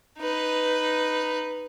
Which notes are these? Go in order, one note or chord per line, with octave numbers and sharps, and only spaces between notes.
D#4 B4